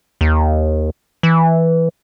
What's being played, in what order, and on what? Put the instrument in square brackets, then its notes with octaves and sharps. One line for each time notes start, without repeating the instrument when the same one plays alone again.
[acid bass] D#2
E3